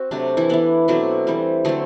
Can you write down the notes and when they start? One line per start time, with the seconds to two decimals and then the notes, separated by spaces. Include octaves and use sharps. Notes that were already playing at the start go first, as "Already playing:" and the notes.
Already playing: C4 F#4
0.11 C3 F#3 A3 D4
0.37 E3 E4
0.49 E3 B3 D4
0.88 B2 F#3 A3 C4 D4
1.27 E3 G3 C4
1.65 D3 F#3 A3 C4 A4